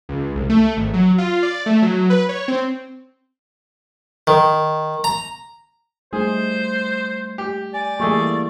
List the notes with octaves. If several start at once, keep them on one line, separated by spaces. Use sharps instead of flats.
C#2
C2
A3
G#1
F#3
F4
D5
A3
F#3
B4
C#5
C4
D#3
A#5
G3 A3 D#4 G#4 C5
G4
D5 G#5
E3 G3 A3 A#3 G#4 C#6